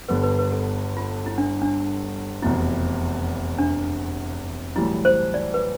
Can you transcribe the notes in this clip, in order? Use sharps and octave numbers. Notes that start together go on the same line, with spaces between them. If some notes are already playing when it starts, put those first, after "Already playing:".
G1 G2 D3 G3 B3 B4
B4
B4
A4
F4
E4
D4
D4
F1 E2 B2 E4
D4
B1 A2 E3 G3 E4
C5
D5
B4